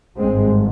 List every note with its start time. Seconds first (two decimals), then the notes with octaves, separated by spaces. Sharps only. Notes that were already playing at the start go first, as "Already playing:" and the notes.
0.18 G#1 G2 G#3 C4